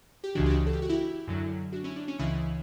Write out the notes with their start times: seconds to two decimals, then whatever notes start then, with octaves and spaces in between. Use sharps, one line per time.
0.24 G4
0.35 C#2 C#3 E3 D4 F#4
0.46 G4
0.50 D4 F#4
0.67 A4
0.73 G4
0.82 F#4
0.89 E4 G4
1.27 F#2 D3 F#3
1.73 D4 F#4
1.84 C#4 E4
1.96 D4
2.08 C#4
2.18 C#2 C#3 E3 C#4 E4